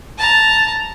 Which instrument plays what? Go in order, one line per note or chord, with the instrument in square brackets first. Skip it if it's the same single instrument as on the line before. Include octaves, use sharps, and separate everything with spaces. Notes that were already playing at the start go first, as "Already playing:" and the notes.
[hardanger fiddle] A5 A#5